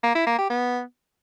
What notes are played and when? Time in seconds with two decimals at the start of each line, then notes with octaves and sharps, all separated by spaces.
0.03 A#3
0.15 E4
0.27 A#3
0.38 G4
0.50 B3